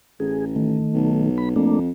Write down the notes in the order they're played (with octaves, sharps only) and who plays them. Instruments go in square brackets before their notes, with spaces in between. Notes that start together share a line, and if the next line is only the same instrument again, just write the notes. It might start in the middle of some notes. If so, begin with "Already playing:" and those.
[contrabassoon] A1 [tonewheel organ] G#4
[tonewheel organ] D#3 A3
[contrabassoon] B1
[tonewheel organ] B5
[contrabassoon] F2 [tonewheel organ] A3 A#3 D4